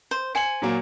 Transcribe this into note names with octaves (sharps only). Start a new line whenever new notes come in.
C5
C5 G#5 C#7 F#7
A#2 F#3 A#3